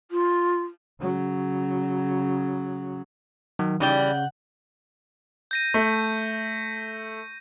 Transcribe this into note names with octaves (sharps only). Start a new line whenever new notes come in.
F4
C#3 F#3
D#3 F#3
C#3 E3 G3 D#4 G4 G6
F#5
G6 A#6 D#7
A3